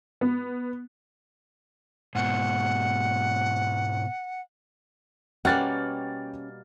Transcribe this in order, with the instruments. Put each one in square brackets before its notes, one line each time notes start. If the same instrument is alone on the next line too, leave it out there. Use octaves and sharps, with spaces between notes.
[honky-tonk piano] B3
[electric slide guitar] G#2 B2 [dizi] F#5
[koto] B2 G3 A#3 [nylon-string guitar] C#4 [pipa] F#5 [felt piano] G5 F6 A6